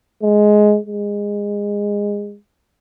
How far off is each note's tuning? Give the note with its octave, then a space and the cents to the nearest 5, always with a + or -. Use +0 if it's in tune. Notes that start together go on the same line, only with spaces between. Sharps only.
G#3 +10
G#3 -20